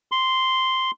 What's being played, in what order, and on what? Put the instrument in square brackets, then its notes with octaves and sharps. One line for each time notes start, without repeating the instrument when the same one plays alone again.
[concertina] C6